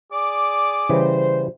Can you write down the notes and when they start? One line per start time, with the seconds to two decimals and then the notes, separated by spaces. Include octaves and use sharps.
0.13 G#4 D5 D6
0.89 C#3 E3 G3 C5